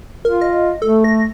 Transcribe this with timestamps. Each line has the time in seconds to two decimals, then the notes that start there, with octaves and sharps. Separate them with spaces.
0.25 F4 A#4
0.41 D#5
0.82 A3 A4
1.04 A#6